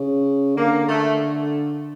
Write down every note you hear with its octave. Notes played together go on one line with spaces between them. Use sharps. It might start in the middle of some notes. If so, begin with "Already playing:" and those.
Already playing: C#3
D3 A#3
A3